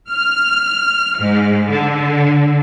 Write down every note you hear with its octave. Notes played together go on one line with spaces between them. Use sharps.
F6
G#2
D3